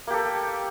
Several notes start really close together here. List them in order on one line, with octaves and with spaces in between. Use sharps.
A#3 G4 A4